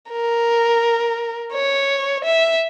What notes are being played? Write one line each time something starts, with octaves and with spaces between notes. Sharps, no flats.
A#4
C#5
E5